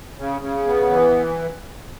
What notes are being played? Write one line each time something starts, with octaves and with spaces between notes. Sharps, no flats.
C#3
C#3
B3
E3